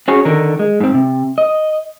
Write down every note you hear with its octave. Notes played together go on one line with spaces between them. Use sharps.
C#4 F#4 G#4 C#5
D3 D#3 A#4
G#3
G#2 C4
C3
D#5